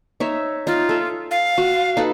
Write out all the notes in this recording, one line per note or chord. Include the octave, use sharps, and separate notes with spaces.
D#4 C#5 E5
D#4 F4
A4 E5
F5
F#4
D#4 A4 B4